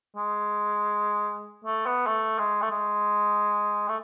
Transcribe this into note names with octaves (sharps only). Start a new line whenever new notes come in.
G#3
A3
B3
A3
G#3
A3
G#3
A3